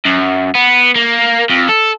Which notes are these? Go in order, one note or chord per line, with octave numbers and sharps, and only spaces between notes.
F#2
B3
A#3
F2
A4